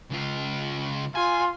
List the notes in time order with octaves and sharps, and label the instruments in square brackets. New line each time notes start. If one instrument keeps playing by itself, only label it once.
[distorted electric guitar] C#2 F4
[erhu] F4 [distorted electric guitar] G#5